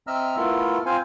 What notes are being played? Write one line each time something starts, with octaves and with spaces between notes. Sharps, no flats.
C4 D#5 E5 A#5 E6 F6
A3 B3 E4 F4 A4 A#4
C4 F4 C5 F5 G#5